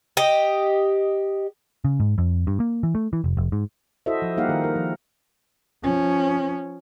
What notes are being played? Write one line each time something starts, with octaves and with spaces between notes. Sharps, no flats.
G4 D#5
C#3
G#2
F2
G2
A#3
E3
A3
E3
F1
F1
G#2
E4 F#4 A4 C5 D#5 E5
F3
G3 A#3 D#4 G4 F5 F#5
D#3 A#4
A#4
F3
F3 C#4